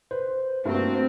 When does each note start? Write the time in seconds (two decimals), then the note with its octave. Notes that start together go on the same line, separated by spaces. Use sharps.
0.11 B4 C5
0.65 G2 A3 A#3 C4 F#4